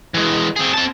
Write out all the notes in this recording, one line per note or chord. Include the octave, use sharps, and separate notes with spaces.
E3 G#3
C4 G#4
C4 A5